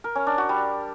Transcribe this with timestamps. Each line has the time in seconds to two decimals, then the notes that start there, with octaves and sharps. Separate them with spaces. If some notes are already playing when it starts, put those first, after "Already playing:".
0.04 A#4
0.15 C#4
0.27 D4
0.38 F#4
0.49 G3